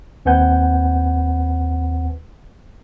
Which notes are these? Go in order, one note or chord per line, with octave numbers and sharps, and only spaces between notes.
D#2 C4 B4 F#5 G#5 G6